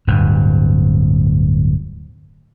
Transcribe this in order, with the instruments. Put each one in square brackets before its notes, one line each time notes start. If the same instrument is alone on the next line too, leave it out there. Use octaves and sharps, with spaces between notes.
[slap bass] D1 G2